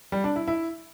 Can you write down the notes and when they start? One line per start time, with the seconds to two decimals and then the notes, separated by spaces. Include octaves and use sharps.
0.12 G3
0.24 D4
0.36 E4
0.48 E4